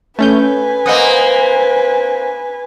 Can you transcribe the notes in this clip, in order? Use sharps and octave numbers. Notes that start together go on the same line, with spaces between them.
A3 C#4 B4 G#5 G6
A#3 C4 D#5 F#5 D#6